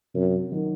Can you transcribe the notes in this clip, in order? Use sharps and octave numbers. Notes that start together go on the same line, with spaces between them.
F#2 C3
D#3 F#3